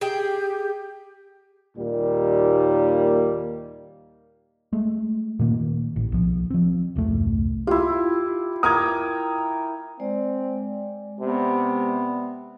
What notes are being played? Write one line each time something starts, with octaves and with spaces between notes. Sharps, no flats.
G4 G#4 G5
D#2 A#2 D#3 G3 A#3
G#3 A3
A#2 D#3 A#3
A1
B1 F3
F3 C4
E1 C2 G2 A3
E4 F4 G4
A#4 G5 D6 D#6 G#6
G#3 C4 D5
C3 B3